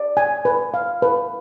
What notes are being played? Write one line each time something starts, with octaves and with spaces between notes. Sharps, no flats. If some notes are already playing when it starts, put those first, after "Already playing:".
Already playing: D5
G#5
B4
F5
B4